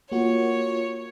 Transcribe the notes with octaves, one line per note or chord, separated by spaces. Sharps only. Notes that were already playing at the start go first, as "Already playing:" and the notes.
A#3 F4 F#4 C#5